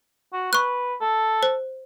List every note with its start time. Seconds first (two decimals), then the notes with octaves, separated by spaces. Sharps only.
0.33 F#4
0.53 B4 C#6 F#6
1.01 A4
1.43 C5